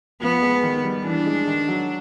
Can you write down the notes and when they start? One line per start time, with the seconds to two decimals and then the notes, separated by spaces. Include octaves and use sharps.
0.21 F3 B3
0.42 G#3
0.63 D#3
0.84 G3
1.05 E3 D4
1.26 G#3
1.47 D#3
1.68 F#3